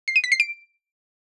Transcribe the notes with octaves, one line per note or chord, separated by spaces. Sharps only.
C7
D#7
B6
C7
D7